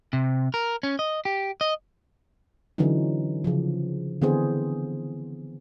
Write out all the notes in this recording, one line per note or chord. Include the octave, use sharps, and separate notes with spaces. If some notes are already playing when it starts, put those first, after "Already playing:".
C3
A#4
C#4
D#5
G4
D#5
D3 E3 F#3 C#4 D#4
C#3 F3
D3 E3 B3 C4 G#4 C5